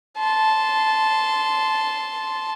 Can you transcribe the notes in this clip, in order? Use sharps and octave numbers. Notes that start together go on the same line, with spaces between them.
A5 C6